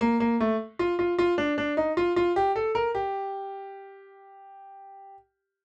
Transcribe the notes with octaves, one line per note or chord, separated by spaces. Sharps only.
A#3
A#3
A3
F4
F4
F4
D4
D4
D#4
F4
F4
G4
A4
A#4
G4